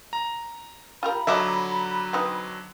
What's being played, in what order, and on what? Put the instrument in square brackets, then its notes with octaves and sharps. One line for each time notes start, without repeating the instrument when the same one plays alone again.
[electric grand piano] A#5
[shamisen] F4 G4 A#4 [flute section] A#5 B5
[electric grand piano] D3 F#3 D6 [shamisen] F3 D#5 E5
[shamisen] C4 D#4 B4